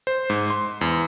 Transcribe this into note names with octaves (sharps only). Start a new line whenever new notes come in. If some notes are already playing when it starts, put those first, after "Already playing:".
C5
G#2
C6
E2